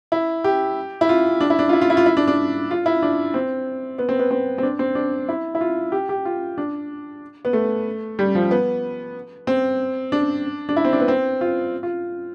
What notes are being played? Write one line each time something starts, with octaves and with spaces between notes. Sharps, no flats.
E4
G4
E4
F4
D4
E4
D4
F4
E4
F4
E4
F4
E4
D4
D4
F4
E4
D4
C4
B3
C4
B3
C4
C4
D4
C4
D4
E4
E4
F4
G4
G4
F4
D4
B3
A3
G3
F3
B3
C4
D4
D4
E4
C4
D4
B3
C4
F4
F4